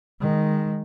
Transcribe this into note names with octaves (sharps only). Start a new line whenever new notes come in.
D#3 G#3